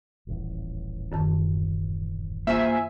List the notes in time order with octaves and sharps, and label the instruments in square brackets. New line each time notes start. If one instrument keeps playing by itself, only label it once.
[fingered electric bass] D#1 A1 E2
[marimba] F#2 D#3 A5
[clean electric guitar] A#3 F4 C5 [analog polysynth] E5 G#5